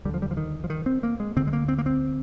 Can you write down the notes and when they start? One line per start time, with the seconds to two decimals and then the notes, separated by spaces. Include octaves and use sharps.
0.05 D#2 D3 G3
0.14 F3
0.22 G3
0.31 F3
0.37 D#3
0.64 F3
0.70 D#3
0.86 C4
1.03 A#3
1.20 G#3
1.36 D2 D3 C4
1.47 G#3
1.53 A#3
1.68 C4
1.78 A#3
1.86 C4